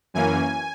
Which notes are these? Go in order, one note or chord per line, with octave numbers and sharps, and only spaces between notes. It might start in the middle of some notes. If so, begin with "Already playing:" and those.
F#2 E3 A#3 C#4 G#5